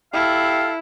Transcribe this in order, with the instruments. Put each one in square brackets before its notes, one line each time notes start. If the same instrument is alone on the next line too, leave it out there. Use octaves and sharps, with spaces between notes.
[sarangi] E4 [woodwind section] G4 A4 F5